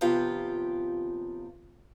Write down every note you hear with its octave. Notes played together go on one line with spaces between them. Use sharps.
D#2 C3 F3 B3 F4 G4